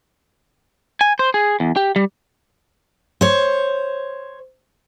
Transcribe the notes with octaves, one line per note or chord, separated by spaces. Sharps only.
G#5
C5
G#4
E2
G4
G3
C5 C#5